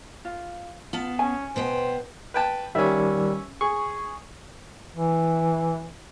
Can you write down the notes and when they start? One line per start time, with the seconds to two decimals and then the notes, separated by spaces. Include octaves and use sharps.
0.25 F4
0.93 B3 F4 F5 A5
1.19 C#4 G#5
1.56 B2 B3 C5 G5
2.34 B4 G5 A5
2.75 D#3 G3 C#4 E5
3.61 G#4 C#6
4.96 E3